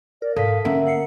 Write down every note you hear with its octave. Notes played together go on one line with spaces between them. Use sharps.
A#4 D5
G#2 A4 F5 B6
D3 A#3 C#4 A#4 E5 F#5
F#5 C7 C#7